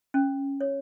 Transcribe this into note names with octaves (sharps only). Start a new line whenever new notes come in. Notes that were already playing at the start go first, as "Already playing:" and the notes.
C#4
C#5